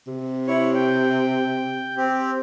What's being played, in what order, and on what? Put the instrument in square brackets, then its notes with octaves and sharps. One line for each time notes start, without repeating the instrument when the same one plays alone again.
[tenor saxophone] C3
[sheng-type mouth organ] E4 C#5
G5
C4 G4